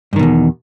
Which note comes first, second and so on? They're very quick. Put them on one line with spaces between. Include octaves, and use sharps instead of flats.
G2 D#3 B2 E2